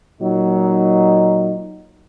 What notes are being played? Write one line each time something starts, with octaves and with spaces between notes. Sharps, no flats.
A#2 F#3 D#4